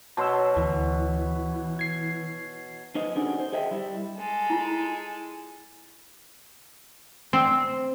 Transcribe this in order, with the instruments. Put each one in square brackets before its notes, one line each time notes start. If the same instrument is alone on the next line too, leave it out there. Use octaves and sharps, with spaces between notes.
[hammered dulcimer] B2 F#3 [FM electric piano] A5 C6 E6
[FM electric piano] D2 [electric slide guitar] E3
[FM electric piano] G#6 C7
[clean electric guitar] D#4 B4 C5 D#5
C#4 D4 F#4 G#4 A4 D5
C5
G#4 D#5 E5 G5
G3 E4
[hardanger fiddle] G#3 A4
[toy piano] E4 F4
[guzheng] C4